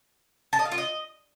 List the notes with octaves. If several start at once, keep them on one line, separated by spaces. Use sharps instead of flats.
A5
D#5
F5
F4
D#5